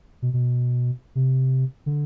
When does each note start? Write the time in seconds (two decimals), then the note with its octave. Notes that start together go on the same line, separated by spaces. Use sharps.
0.22 B2
0.33 B2
1.15 C3
1.86 D3